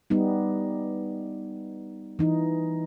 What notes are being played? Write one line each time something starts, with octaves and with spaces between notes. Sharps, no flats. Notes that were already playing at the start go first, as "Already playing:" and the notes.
G3 B3 D#4
E3 D#4